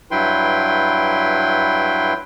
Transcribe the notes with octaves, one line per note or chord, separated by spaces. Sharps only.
G2 F#3 E4 B4 G5 C6